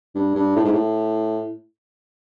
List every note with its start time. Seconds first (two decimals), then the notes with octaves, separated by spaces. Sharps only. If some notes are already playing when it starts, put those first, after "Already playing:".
0.15 G2
0.35 G2
0.56 A2
0.64 G#2
0.72 A2